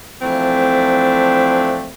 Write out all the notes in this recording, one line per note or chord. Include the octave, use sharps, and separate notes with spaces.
E3 F3 A3 C4 D4